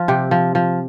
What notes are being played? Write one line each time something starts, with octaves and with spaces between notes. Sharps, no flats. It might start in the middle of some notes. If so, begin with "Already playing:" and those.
Already playing: F3 F4
C3 G4
F3
F3